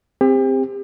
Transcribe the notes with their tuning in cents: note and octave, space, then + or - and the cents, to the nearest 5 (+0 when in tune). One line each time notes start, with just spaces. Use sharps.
C4 +0 G4 +35